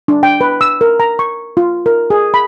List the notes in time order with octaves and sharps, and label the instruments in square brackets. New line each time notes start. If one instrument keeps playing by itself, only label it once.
[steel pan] D4
G5
B4
E6
A#4
A#5
C#6
F4
A#4
G#4
B5